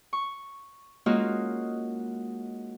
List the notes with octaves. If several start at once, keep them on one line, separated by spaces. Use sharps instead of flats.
C#6
G#3 A#3 C#4 D#4 F4 F#4